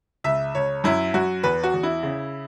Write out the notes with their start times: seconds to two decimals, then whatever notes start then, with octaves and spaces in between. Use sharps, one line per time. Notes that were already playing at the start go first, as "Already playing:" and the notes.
0.24 C#2 E5
0.55 C#2 C#5
0.84 F#2 E4
1.14 F#2 F#4
1.43 E2 B4
1.63 F#4
1.74 E2
1.83 E4
2.03 C#3